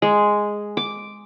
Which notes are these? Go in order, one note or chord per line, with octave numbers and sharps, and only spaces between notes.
G#3
D6